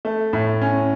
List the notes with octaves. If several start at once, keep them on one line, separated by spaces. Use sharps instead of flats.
A3
A2
C#4